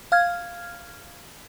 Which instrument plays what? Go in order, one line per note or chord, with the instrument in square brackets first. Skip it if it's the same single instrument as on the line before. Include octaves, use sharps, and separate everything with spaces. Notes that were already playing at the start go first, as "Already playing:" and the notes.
[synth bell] F5 F6 G#6